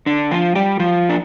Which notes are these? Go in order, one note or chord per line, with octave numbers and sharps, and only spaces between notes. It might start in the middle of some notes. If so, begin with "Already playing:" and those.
D3 D4
F3 F4
G3 G4
F3 F4
D4